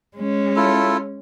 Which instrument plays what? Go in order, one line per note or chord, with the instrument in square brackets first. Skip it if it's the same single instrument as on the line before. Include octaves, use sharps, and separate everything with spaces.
[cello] G#3 C#4
[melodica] E4 F4 A4